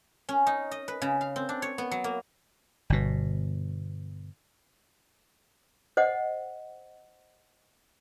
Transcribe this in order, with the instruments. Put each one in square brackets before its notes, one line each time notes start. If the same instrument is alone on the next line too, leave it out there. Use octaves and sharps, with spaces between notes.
[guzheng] C#4
D#4
D#5
B4
C#3
F5
C4
D4
C#5
B3
F#3
A#3
[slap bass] G1 B2
[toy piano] C5 D#5 F#5